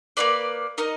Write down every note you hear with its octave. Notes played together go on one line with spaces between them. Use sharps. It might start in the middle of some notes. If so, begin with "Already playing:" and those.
A#3 F4 B4 D5
D#4 A#4 D#5